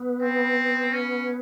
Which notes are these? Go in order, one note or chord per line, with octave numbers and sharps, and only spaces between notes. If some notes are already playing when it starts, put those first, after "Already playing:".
Already playing: B3
C4
C#4